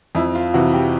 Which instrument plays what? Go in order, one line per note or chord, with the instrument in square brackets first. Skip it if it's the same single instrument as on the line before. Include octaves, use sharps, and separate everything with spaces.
[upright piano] F2 E4
F4
C3 E3 F#4
G4